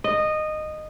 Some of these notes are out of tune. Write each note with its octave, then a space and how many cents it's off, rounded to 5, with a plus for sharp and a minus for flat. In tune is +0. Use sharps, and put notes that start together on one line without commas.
D#5 -15